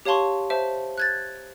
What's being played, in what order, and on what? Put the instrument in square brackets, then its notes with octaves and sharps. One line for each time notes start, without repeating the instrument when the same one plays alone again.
[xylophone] G4 C#5 F5 A5 C6 C#6
C5 E5 A5
F#6 G#6 A6